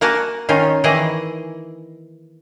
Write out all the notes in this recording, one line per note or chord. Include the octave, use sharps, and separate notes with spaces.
A#3 F#4 A#4 F#5 G#5 A5
D#3 C#4 D#4 F4
D#3 E3 E4 G#4 D5 D#5